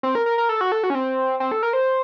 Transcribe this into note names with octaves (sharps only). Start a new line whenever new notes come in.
C4
A#4
A#4
A#4
A4
F#4
A4
F#4
C#4
C4
C4
A4
A#4
C5